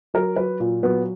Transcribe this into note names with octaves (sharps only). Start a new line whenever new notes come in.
F#3 A#4
F#3 B4
A#2
F#3 B3